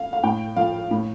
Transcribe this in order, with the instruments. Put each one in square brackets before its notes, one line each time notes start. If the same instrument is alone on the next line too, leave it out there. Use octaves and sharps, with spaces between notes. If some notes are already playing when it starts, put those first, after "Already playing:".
Already playing: [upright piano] F5
F5
A2 G5
F3 F5
A2